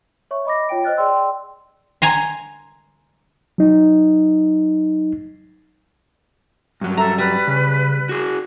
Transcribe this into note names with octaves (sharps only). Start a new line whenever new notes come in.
C#5 E5 C#6
D#5 B5 D6 A#6
F4 C#5 G5 D7
C5 D#5 F6 F#6 A6
G#4 D5 G5 C6 E6
G#5 A#5 C6
F#3 D#4
G2 F#3
A4 E5 A#5
G3 B4
C#3
F#4 G#4